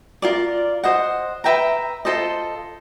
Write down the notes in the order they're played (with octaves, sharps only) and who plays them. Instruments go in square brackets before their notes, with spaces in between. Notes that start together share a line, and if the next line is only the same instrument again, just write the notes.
[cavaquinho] F4 A#4 D5
C5 D#5 F#5
B4 E5 G5 A#5
F4 A4 C5 D#5